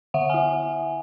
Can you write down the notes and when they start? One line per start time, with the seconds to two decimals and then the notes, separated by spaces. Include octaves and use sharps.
0.14 D3 E5 F#5
0.29 E4 F#5 G#5